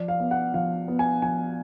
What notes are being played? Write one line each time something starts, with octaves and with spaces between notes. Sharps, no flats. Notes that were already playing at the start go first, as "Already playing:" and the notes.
Already playing: F3 D5
F5
B3
F#5
F3 F5
B3
G#5
F3 G#5